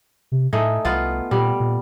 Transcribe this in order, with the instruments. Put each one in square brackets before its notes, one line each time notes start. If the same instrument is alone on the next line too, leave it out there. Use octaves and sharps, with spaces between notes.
[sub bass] C3
[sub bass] A2 [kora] A3 D#4 G#4
[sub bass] C2 [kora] B3 F4
[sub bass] A#2 [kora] G3
[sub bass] A#2